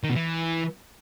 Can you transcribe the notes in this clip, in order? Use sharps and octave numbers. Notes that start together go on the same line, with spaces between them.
D#3
B2
E3